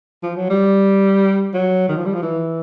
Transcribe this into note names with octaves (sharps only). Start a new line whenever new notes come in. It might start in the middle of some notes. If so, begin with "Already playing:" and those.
F3
F#3
G3
F#3
D#3
F3
G3
F3
E3